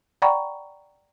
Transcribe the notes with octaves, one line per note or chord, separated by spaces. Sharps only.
D5 F#5 G5 A#5 B5 C#6